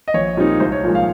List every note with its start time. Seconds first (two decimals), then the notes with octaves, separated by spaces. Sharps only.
0.08 D#5
0.14 A#1 C#5
0.37 A#2 G3 C4 D#4
0.60 C2 C5
0.72 C#5
0.84 A#2 F3 G#3
0.95 F5